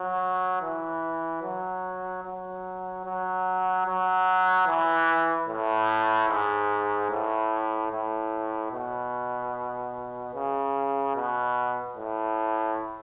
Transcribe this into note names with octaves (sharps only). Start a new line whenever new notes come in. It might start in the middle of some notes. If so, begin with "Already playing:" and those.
Already playing: F#3
E3
F#3
F#3
F#3
F#3
E3
A2
G#2
A2
A2
B2
C#3
B2
A2